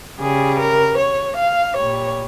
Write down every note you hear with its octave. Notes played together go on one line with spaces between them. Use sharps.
C#3 G3 G#4
A#4
C#5
F5
A#2 G3 C#5